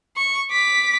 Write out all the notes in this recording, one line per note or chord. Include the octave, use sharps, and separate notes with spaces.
C#6
D6 B6